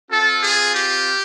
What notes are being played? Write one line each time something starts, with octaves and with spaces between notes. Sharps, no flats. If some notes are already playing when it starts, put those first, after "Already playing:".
C4 F4 A4
G#4
G4